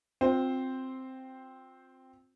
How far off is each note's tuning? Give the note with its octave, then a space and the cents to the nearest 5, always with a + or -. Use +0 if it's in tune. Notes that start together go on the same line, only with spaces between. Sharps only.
C4 +0 F4 +30 C5 +0